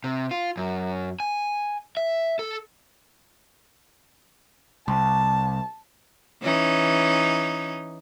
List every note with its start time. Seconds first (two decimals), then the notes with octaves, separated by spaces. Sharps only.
0.04 C3
0.31 F4
0.57 F#2
1.20 G#5
1.97 E5
2.39 A4
4.88 C2 A5
6.42 E3 C#4 D#4